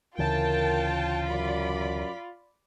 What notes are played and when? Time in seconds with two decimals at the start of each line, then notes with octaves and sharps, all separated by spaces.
0.18 D2 C#3 E3 F4 A#4 G5 A5
1.27 F#2 D5 B5